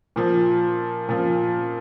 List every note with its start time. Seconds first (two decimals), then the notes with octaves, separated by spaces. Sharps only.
0.16 A#2 F3
1.09 A#2 F3